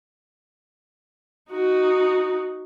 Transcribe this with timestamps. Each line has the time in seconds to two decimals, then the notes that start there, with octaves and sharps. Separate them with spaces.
1.51 D#4 F#4